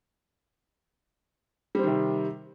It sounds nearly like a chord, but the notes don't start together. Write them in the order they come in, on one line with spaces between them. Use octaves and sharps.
G3 C4 D#3 C3